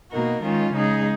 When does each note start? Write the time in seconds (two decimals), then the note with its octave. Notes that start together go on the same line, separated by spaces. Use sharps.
0.12 B2 A#3 D#4 F#4 A#4
0.42 D#3 G#3 C#4 F4
0.73 C#3 G#3 D#4 G#4